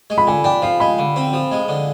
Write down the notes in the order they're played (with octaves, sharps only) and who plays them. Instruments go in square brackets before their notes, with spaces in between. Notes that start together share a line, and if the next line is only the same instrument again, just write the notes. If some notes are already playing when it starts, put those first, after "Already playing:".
[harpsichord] G#3
[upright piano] B5
[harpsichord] D3 [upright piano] G#5
[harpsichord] D4 [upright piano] G5
[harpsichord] F3 [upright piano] F5
[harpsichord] G#3 [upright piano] B5
[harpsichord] D3
C4
F3
G#3
D3